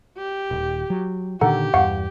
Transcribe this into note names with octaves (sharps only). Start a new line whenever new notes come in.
G4
D#1
F#3
A#2 D3 D#3 G4 A4 F#5 A#5
E2 G2 F5 F#5 C#6